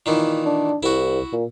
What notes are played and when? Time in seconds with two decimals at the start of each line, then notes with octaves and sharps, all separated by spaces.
0.06 A#2 D#3 E3
0.46 D4
0.83 C2 E4 F#4
1.32 A#2